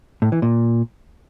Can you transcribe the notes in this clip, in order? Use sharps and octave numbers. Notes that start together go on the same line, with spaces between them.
A2
E3
A#2